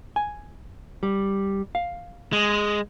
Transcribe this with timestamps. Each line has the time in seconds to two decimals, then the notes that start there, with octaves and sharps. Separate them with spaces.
0.16 G#5
1.03 G3
1.75 F5
2.33 G#3